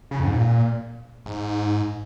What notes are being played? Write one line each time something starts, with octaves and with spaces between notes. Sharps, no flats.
C#3
F2
G#2
A#2
G#2